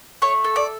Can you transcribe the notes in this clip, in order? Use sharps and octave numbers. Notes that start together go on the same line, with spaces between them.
A3 C#5
A4
D5